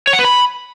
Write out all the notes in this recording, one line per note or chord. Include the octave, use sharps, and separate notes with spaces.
C#5
F#5
B4
B5